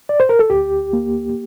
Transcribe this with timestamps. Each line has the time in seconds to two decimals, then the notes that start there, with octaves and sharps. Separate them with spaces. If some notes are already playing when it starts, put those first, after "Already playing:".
0.09 D5
0.20 C5
0.29 A#4
0.39 A4
0.50 D2 G4
0.93 A#3